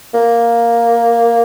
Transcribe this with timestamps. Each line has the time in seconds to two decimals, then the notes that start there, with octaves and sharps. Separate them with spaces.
0.14 A#3